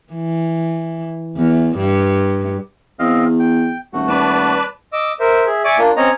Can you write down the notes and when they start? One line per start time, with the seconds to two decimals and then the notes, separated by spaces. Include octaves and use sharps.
0.13 E3
1.36 E2
1.77 G2
2.99 E2 C4 D#5 F5
3.39 G5
3.93 D#1 A3 F#4
4.08 D#1 B4 D5 A5
4.93 D#5 D6 E6
5.20 A#4 C5 E5
5.46 G#4 E5
5.64 D5 E5 G#5 C#6 D6
5.78 A#3 D4 F4
5.97 C4 C#4 C#5 D#5 A#5